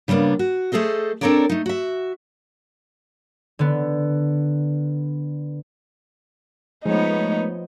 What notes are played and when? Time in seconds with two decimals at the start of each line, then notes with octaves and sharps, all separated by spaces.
0.08 C#3 G3 A#3 B3 D4
0.39 F#4
0.72 A3 G#4 A4 C5 D#5
1.21 C4 D4 A4 A#4 C#5 D5
1.49 A3 D#4
1.66 F#4 E5
3.59 D3 B3
6.86 F3 G#3 A3 B3 D#4 C5 C#5